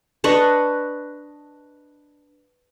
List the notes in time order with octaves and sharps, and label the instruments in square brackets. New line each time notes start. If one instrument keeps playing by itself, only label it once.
[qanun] D4 B4 D#5 C#6